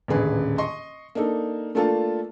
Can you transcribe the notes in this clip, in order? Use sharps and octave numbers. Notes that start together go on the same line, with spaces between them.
D#1 A1 D3 G#4 B4
D#5 C6 C#6
A#3 D4 D#4 A4
A3 A#3 D4 F4 A4 A5